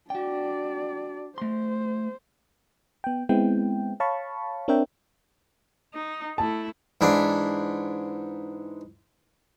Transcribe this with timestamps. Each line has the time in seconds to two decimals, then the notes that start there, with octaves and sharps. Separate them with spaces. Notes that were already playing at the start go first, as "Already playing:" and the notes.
0.10 D4 F#4 D5 G5
1.38 A3 C5 C6
3.04 B3 G5
3.29 G#3 B3 C4 E4 G5
4.00 C#5 F5 A5 B5 C#6
4.68 C4 D4 A#4 C#5 E5 G5
5.94 D#4
6.38 A3 E4 A5
7.01 G#2 E3 D4